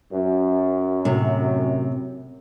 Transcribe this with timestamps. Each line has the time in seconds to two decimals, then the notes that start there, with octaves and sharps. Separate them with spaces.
0.13 F#2
1.05 A2 C3